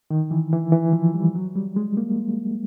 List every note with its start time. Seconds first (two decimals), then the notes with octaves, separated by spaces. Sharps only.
0.10 D#3
0.31 E3
0.53 E3
0.72 E3
0.93 F3
1.14 G3
1.35 F#3
1.55 G3
1.76 G#3
1.97 A#3